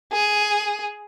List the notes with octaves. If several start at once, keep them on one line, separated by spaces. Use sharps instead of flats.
G#4